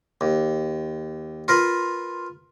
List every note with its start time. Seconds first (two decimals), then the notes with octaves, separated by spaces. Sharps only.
0.21 D#2
1.48 F4 A#4 B4